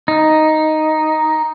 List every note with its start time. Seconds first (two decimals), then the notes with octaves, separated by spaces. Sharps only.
0.08 D#4